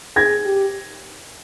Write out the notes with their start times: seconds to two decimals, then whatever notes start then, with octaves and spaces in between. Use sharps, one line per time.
0.16 G#4 G#6 A#6
0.45 G4